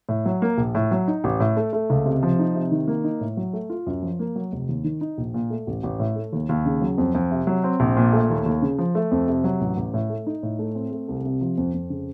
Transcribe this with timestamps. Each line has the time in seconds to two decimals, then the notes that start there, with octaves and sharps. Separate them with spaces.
0.09 A2
0.25 F#3
0.42 A#3
0.58 A#1
0.75 A2
0.91 F#3
1.08 D#4
1.24 A1
1.40 A2
1.57 A3
1.73 A3
1.90 C#2
2.06 C3
2.23 F3
2.39 D#4
2.55 C3
2.71 D#3
2.88 A#3
3.04 D#4
3.21 A2
3.37 F#3
3.53 A3
3.70 F4
3.87 F#2
4.02 F3
4.19 A#3
4.36 F#3
4.52 F1
4.69 D#2
4.84 D#3
5.01 D#4
5.18 A#1
5.34 A#2
5.50 A3
5.67 A1
5.83 A1
6.00 A2
6.16 A3
6.33 D#2
6.49 D#2
6.66 C#3
6.82 F#3
6.98 F2
7.14 F2
7.31 C3
7.47 F#3
7.64 C4
7.80 A#1
7.97 A#2
8.13 A3
8.30 D#2
8.46 D#2
8.62 C#3
8.79 F3
8.95 A3
9.11 F2
9.28 C3
9.44 F#3
9.61 A1
9.77 A1
9.94 A2
10.10 A3
10.27 D#4
10.43 A2
10.59 A3
10.75 C4
10.92 A3
11.08 C2
11.25 C3
11.41 F3
11.58 F2
11.74 F2
11.90 C#3